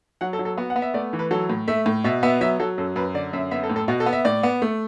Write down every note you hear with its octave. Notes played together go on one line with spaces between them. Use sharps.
F#3 F#5
A4
F#3
A4
B3 F#4
F#5
B3
E5
A3 D5
E3
B4
F#3 A4
A2
A3 E5
A2
B2 E5
B3 E5
F#3 E5
F#3 A4
F#2 A4
F#2 B4
D3 D5
F#2 E5
B3 E5
A4
A2
A4
B2 F#4
A4
B3
E5
A2 D5
B3
A3